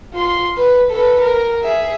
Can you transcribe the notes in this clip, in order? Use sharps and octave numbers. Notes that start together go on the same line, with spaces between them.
F4 C6
B4
A4 B4
A#4
G#4 E5